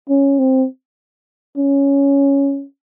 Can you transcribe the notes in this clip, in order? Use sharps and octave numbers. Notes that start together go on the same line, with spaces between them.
C#4
C4
C#4